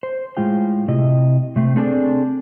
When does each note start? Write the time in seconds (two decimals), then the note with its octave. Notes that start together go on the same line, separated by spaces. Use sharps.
0.03 C5
0.37 A2 G#3 F4 G5
0.88 C3 E4 D#5
1.56 C3 A3 C4
1.76 A3 C4 D4 G#4 A4 D5